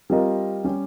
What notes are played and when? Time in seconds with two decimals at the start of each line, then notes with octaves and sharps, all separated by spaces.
0.10 G3 C4 F4 A#4 D#5
0.64 G3 C#4 G4